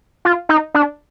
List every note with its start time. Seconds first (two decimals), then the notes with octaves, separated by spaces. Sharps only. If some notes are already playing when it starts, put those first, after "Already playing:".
0.25 F4
0.49 D#4
0.74 D4